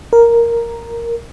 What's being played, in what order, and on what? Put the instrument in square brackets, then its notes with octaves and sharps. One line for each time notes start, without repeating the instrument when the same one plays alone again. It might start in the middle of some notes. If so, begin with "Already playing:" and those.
[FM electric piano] A#4